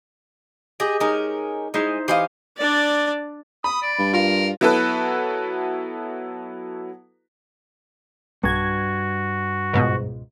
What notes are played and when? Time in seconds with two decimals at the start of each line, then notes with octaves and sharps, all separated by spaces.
0.80 G4 G#4 D#5
1.00 G#3 C#4 D#4 A#4
1.74 G#3 D#4 E4 C5
2.08 E3 D#4 G4 C5 F5
2.57 D4 D5
3.64 B5 D#6
3.82 D5
3.99 G2
4.13 F4 A#4
4.61 F#3 B3 E4 F#4 A4 B4
8.44 B1 G2 F#4 G#6
9.73 C#2 G#2 B2